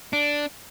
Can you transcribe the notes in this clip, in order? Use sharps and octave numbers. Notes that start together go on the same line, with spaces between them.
D4